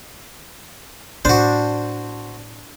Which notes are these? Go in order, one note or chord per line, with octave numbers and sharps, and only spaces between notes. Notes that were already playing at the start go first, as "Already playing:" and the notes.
A2 B3 D4 F#4 C5